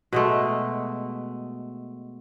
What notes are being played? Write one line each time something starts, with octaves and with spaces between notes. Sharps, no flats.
B2 G#3 A3